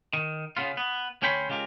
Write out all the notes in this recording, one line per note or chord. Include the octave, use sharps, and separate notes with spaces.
D#3
C#3 B3 F4
B3
D2 C#4 C#5 G5 B5 C6
C#3 G#3 F4 G4 A#4